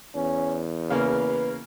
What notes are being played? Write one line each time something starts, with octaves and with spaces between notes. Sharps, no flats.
E2 C#4
C#3 A#3 B4